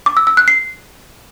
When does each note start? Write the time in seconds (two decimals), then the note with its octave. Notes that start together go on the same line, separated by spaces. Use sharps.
0.06 D6
0.17 E6
0.27 E6
0.37 F#6
0.48 C7